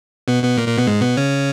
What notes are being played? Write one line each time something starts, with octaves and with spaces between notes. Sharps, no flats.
B2 B3
B2 B3
A#2 A#3
A#2 A#3
B2 B3
G#2 G#3
B2 B3
C#3 C#4